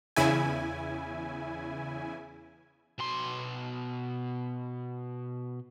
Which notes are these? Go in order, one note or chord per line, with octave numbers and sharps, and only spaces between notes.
E2 C#3 E4 G#5
B2 C6